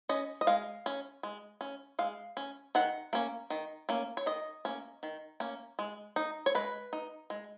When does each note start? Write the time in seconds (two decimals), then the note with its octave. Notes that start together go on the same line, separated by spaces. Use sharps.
0.09 C#4 D#5
0.41 D#5
0.47 G#3 F5
0.86 C#4
1.23 G#3
1.61 C#4
1.99 G#3 F5
2.37 C#4
2.75 D#3 F#5
3.13 A#3 C#4
3.50 D#3
3.89 A#3 C#4
4.17 C#5
4.26 D#3 D#5
4.65 A#3 C#4
5.03 D#3
5.40 A#3 C#4
5.79 G#3
6.16 D#4
6.46 C#5
6.55 G#3 B4
6.93 D#4
7.30 G#3